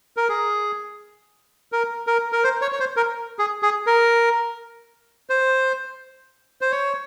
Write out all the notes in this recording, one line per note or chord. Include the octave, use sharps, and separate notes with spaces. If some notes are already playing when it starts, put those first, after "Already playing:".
A#4
G#4
A#4
A#4
A#4
C5
C#5
C#5
C5
A#4
G#4
G#4
A#4
C5
C5
C#5